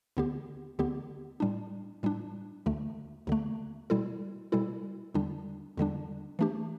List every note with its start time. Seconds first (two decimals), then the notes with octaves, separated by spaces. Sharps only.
0.17 D2 D3 B3 G4
0.79 D2 D3 B3 G4
1.40 A2 G3 D4
2.03 A2 G3 D4
2.66 D2 D3 A3
3.27 D2 D3 A3
3.90 B2 G3 E4 A4
4.52 B2 G3 E4 A4
5.14 E2 D3 G3 D4
5.77 E2 D3 G3 D4
6.39 E3 A3 D4 G4